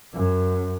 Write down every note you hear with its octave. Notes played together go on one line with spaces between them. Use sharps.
F#2